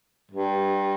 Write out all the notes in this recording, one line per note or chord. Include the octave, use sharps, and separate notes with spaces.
G2